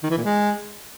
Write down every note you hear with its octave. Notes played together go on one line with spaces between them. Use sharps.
D#3
E3
A#2
G#3